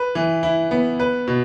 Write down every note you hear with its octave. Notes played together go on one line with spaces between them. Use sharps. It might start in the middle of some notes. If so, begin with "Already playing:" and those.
Already playing: B4
E3
E4
B3
B4
B2